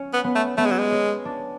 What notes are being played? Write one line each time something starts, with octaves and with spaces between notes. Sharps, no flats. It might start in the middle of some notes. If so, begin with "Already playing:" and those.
Already playing: C#4
B3
B3
A3
A3 B3
G#3
F#3
G#3
C#4
D4